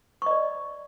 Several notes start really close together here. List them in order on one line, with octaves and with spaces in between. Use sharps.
C#6 D#5 D5